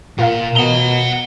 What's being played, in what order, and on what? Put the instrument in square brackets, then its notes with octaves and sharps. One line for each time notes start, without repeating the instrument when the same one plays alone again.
[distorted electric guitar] A#2 [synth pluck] F4 A#4 F5
[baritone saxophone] B2 [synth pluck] D#5 [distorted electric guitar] F#5 A#5 [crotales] G7